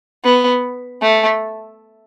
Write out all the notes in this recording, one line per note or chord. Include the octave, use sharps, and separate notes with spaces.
B3
A3